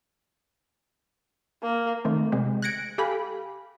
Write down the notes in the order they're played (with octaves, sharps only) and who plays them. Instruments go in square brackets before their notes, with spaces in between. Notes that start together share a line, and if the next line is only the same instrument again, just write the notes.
[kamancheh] A#3
[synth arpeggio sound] D#3 A3 C4
C3 G#3 C4
F#6 G#6 A#6 C#7 D7
G4 A4 F5 G#5 B5